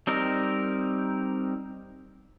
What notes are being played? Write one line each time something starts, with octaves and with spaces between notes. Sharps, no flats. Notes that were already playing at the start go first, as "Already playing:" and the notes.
G3 C4 D#4 A#4